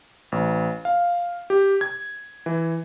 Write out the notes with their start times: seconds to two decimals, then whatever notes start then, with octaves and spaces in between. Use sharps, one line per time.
0.32 A1
0.85 F5
1.50 G4
1.81 G#6
2.46 E3